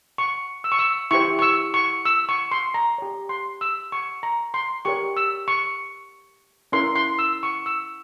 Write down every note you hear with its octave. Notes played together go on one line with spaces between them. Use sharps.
C#6
E6
C#6
E6
E4 G4 C5 C#6
C#6
E6
C#6
E6
C#6
C6
A#5
G4 C#5
C6
E6
C#6
A#5
C6
G4 A#4 C#5 C#6
E6
C#6
C#4 E4 A#4 C6
C6
E6
C#6
E6